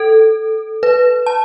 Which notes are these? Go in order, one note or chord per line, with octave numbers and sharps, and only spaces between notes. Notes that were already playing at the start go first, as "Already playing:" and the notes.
Already playing: A4
B4
A5